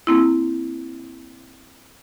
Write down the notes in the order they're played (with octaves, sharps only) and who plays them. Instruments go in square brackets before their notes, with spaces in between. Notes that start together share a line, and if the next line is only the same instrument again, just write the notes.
[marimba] A#3 C4 E4